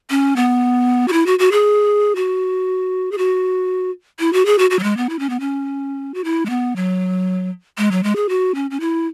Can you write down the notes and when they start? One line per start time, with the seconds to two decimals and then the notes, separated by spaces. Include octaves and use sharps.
0.10 C#4
0.36 B3
1.08 F#4
1.13 E4
1.26 F#4
1.39 F#4
1.52 G#4
2.16 F#4
3.12 G#4
3.18 F#4
4.19 E4
4.33 F#4
4.46 G#4
4.58 F#4
4.71 F#4
4.79 F#3
4.83 G#3
4.97 B3
5.09 E4
5.19 C#4
5.30 B3
5.40 C#4
6.14 F#4
6.24 E4
6.46 G#3
6.50 B3
6.76 F#3
7.78 G#3
7.91 F#3
8.03 G#3
8.16 G#4
8.29 F#4
8.55 C#4
8.71 C#4
8.80 E4